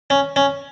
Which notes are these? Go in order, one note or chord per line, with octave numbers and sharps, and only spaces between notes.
C#4
C#4